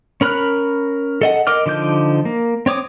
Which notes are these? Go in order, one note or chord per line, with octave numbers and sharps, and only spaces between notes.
C#4 A#4 B5 F6 F#6
A4 D#5 F#5
A#4 D#5 D6 F6
D3 F3 D#4 D6 G6
A#3
C4 C#5 D6 D#6